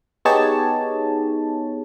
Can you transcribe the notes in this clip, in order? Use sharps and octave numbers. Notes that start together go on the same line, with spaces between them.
B3 D#4 G4 G#4 C#5 A5